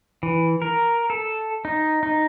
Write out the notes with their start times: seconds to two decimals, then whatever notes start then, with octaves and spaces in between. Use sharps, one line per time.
0.23 E3
0.62 A#4
1.10 A4
1.65 D#4
2.03 D#4